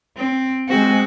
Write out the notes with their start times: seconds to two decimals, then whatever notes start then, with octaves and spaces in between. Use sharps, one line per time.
0.17 C4
0.69 G#3 C4 F#4